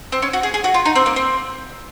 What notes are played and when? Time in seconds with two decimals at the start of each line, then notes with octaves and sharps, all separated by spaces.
0.12 C4
0.22 C#4
0.33 F#4
0.43 G#4
0.54 G#4
0.64 F#4
0.74 F4
0.86 D#4
0.96 C4
1.06 A#3
1.16 C4